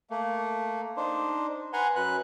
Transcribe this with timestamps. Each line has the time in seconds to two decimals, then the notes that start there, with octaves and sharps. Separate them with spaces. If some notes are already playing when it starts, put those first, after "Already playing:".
0.10 A3 A#3
0.97 D4 D#4 C5
1.73 B4 F#5 G#5 A#5 C6
1.96 F#2 B4 F#6